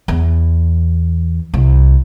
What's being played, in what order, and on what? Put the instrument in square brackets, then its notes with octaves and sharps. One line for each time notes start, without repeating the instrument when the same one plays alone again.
[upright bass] E2
C2